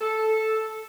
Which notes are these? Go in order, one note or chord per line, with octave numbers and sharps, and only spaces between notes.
A4